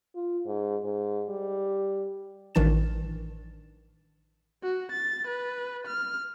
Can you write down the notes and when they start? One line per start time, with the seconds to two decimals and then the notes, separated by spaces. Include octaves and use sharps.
0.15 F4
0.45 G#2
0.84 G#2
1.29 G3
2.55 A1 D#3 E3 D4 A6 E7
4.63 F#4
4.92 A6
5.27 B4
5.87 F6